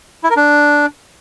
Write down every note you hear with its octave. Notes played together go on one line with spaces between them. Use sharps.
E4
A#4
D4